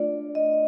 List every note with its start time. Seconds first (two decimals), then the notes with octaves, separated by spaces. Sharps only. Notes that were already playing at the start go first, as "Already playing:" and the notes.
Already playing: A3 D4 F4 D5
0.35 D#5